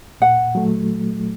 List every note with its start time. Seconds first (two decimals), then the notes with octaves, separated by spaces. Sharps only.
0.20 A#2 F#5
0.55 F#3 A3